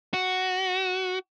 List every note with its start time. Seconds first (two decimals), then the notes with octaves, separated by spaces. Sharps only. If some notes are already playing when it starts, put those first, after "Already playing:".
0.14 F#4